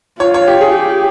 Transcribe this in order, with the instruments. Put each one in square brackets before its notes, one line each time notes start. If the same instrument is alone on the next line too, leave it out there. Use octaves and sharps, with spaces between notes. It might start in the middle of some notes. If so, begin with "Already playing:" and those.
[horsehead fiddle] F4 [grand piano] C#5
[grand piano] C#5
G4
G#4
[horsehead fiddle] G4